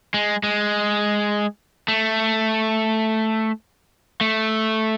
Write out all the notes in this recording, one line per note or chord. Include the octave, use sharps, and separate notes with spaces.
G#3
G#3
A3
A3